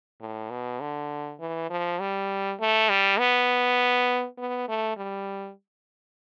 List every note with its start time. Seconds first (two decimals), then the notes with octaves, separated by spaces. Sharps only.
0.21 A2
0.51 B2
0.80 D3
1.40 E3
1.70 F3
2.00 G3
2.60 A3
2.90 G3
3.19 B3
4.38 B3
4.69 A3
4.97 G3